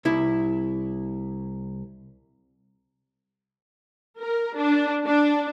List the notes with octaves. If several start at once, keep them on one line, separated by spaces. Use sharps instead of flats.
C2 E4
A#4
D4
D4